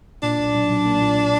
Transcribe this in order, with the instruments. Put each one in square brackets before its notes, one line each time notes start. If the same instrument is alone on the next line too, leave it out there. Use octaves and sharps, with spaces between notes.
[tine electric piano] A#2 [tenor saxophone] D4
[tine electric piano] B1
B1
B1
A#3
A#2